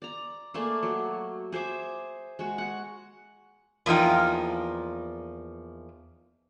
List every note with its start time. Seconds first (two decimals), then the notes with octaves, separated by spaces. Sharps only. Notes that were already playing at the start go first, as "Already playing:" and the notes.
0.02 D5 A#5
0.54 A3 A#3 G#4 D5
0.83 F#3
1.52 G#4 C5 E5 D6
2.39 G#3 F#4
2.58 F#5
3.86 E2 F3 A#3 D#4 F4 G5